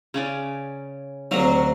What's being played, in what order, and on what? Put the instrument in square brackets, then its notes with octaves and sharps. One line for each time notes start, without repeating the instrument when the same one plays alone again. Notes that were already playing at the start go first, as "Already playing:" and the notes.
[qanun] C#3 C#4 D5
[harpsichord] D2 C3 F#3 [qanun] F#4 F5 A#5